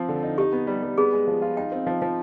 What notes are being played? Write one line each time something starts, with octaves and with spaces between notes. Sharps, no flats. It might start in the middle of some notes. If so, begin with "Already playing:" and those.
Already playing: F3 C4
D3
D#4
D#4 G4
B3
G3
G3
B3 G#4
G#3
F3
F4
D#4 G5
C4
F3
F3